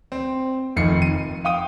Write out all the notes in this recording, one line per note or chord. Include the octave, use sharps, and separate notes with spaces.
C4
F1 F2 D#3 C7 C#7
D#7
F5 G5 D#6 D#7